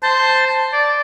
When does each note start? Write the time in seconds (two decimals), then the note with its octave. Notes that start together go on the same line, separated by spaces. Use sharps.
0.03 C5 A5
0.73 D5